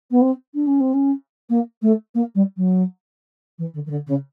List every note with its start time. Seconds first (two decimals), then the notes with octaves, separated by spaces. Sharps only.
0.11 B3
0.21 C4
0.54 D4
0.67 C#4
0.80 C4
0.94 C#4
1.49 A#3
1.82 A3
2.14 A#3
2.35 G3
2.57 F#3
3.58 E3
3.74 D3
3.86 D#3
3.90 D3
4.07 C#3